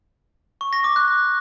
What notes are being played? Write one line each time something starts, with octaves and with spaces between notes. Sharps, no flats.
C#6
A#6
D6
F#6